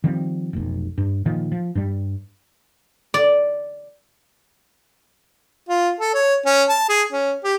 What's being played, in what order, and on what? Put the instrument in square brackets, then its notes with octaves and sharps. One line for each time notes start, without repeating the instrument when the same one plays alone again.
[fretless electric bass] D#3 F3 G3 C4
F1 B1
G2
A#2 D#3 F3
F3
G2 G3
[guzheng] D5
[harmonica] F4
A4
C#5
C#4
A5
G#4
C#4
G4